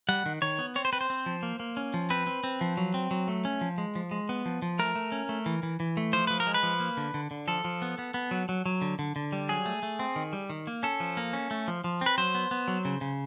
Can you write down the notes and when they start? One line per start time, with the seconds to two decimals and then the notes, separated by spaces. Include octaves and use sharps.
0.09 G3 F#5
0.26 D#3
0.42 D#3 C#5
0.59 B3
0.76 C4 C#5
0.85 C5
0.93 C4 B4
1.01 C5
1.10 C4
1.26 F3
1.43 A#3
1.60 A#3
1.77 C#4
1.94 F3
2.10 C4 B4
2.27 C4
2.44 C4
2.61 F3
2.77 F#3
2.94 C4
3.11 F#3
3.28 A3
3.45 C#4
3.61 F3
3.78 G#3
3.95 F3
4.11 G#3
4.29 B3
4.46 F3
4.62 F3
4.79 A3 A#4
4.95 A3
5.12 C#4
5.29 A3
5.46 E3
5.63 E3
5.80 E3
5.97 A3
6.13 F3 C5
6.27 F3 B4
6.40 A#4
6.47 G#3
6.54 B4
6.63 F3
6.80 A#3
6.97 D3
7.14 D3
7.31 D3
7.48 F3 A4
7.65 F3
7.82 B3
7.99 B3
8.14 B3
8.31 F#3
8.49 F#3
8.66 F#3
8.82 D3
8.99 D3
9.16 D3
9.32 G3
9.49 F#3 G#4
9.66 A3
9.83 A3
9.99 C4
10.16 D#3
10.33 G3
10.50 D#3
10.67 A#3
10.83 C#4 A4
11.00 F3
11.17 A#3
11.33 C#4
11.51 A3
11.68 F3
11.84 F3
12.01 C4 B4
12.18 F#3 C5
12.35 B3
12.51 B3
12.68 F#3
12.85 C#3
13.01 C#3